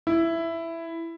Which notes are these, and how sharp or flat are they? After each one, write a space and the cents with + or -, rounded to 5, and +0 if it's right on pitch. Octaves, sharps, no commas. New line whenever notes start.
E4 +10